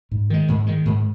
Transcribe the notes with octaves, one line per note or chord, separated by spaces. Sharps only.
G#2
D#3 G#3
G#2
D#3 G#3
G#2